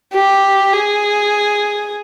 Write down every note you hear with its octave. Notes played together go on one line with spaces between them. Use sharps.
G4
G#4